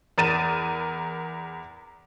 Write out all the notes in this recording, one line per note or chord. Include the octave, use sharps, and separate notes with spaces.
E2 A#4 A6 D#7 E7